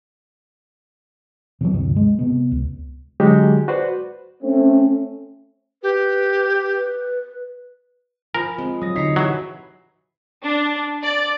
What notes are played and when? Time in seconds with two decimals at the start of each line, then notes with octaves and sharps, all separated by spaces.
1.61 C3 D#3 F3 F#3
1.74 D2 G2 C3
1.96 G#3
2.19 C3 B3
2.51 C#2
3.20 D3 F#3 G#3 F#4 G4
3.68 F#4 B4 C5 D5
4.43 A3 C4 C#4
5.83 G4 B4
6.74 B4
8.34 F3 A#4 G#5 B5
8.58 G#3 C4
8.82 F#3 D#6 A#6
8.96 D3 D#4 C#5 D#5 A#5 B6 C7
9.16 E3 F#3 F#4 G4 B4 E5
10.45 D4
11.03 D5